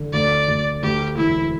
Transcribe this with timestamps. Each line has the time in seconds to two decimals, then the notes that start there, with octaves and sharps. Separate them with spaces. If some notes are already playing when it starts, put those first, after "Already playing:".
Already playing: D3
0.13 D2 D5
0.48 D2
0.83 D2 G4
1.17 E1 E4